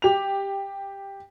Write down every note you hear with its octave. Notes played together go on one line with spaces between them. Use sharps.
G4 F7